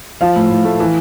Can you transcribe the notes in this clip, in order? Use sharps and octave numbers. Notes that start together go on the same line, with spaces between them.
F3 F5
A2
A2
A3
E3